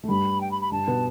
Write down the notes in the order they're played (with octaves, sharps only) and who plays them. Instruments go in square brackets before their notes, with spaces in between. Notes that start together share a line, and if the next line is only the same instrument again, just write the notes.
[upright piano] A3
[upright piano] G2 G3 [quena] B5
[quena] G5
B5
B5
[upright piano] G2 G3 [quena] A5
[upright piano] B2 B3